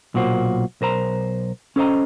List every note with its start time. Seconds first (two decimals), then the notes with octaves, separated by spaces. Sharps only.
0.14 B1 A#2 A#3 F#4 C5
0.81 B1 A#4 C5 A#5
1.76 C#4 A4 C5 D#5 A#5